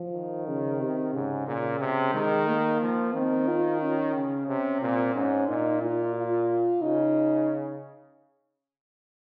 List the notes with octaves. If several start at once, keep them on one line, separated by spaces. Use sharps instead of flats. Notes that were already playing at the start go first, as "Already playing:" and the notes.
Already playing: F3
D#3
C#3
C3
G#2 C#3
A#2 C#3
C3
D#3 G#3
A#3
F3
D#3 C4
F4
C#4
C#3
C3
A#2 C4
G#2 C#4
A#2 D#4
A#2 F4
F4
C#3 D#4